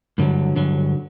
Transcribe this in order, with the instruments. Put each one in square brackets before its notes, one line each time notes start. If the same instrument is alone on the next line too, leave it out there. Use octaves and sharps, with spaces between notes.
[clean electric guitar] G2 D3 F#3
G2 D3 F#3